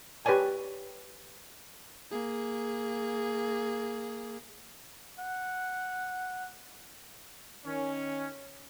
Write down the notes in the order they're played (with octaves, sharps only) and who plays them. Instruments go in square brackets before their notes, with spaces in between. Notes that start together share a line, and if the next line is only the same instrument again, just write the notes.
[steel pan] G4 B4 C#5 D5 G#5 A5
[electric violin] A#3 G#4
[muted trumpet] F#5
[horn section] D#3 C#4